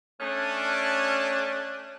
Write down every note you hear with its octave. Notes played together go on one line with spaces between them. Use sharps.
A3 C#4 D4